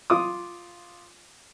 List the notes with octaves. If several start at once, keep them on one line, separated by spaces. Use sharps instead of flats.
F4 D6 D#6